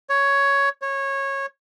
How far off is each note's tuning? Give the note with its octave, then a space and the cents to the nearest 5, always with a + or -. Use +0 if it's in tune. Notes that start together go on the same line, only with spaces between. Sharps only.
C#5 +10
C#5 -15